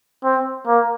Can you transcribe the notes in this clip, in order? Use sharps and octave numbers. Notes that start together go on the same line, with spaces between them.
C4
A#3